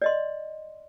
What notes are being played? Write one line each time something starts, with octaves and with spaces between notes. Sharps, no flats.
D5 D#5 C6